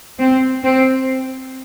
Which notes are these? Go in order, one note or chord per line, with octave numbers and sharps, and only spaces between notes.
C4
C4